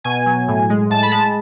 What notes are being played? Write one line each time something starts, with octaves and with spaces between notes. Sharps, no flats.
B2 G#5
F#3
A2
G#3
A2 A5
B5
G#3 A5